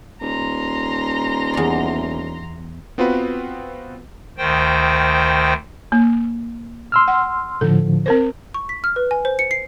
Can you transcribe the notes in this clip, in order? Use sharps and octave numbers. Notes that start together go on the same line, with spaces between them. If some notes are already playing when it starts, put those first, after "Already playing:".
D#1 A#5 C6
E2 D5
B3 C4 F4 F#4 B4
D2 D#3 C5 G5
A#3
C6 E6 F6
F#5
A2 D3 F3 A4
C4 A#4 C5
C#6
B6
F6
B4
G#5
C5
C#7
C7